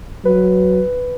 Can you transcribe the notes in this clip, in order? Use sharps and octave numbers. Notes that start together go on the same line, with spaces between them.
F#3 B4